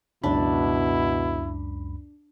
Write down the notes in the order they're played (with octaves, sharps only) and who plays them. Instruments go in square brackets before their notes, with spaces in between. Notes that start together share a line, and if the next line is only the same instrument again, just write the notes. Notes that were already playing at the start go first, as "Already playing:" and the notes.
[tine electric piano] C#2 F#2 B5 [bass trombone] B2 [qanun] D4 [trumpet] E4